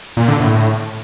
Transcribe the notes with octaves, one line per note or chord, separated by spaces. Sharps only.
A#2
D3
A2